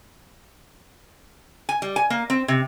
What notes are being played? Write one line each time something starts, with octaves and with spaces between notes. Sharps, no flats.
G#5
G3
G#5
A#3
C4
C3